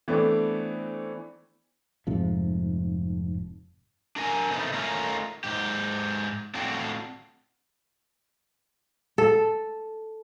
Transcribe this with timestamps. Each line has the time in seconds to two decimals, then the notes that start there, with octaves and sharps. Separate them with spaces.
0.08 E3 A3 B3 C4 D4
2.07 F1 G#2 C3 F3
4.16 D4 A#4 G#5
4.50 C3 A3 B3 D#4
4.73 A3 C#4 D#4 F4 A#4
5.44 G#2 G4
6.54 A2 C4 D4 F4 F#4 G5
9.18 A4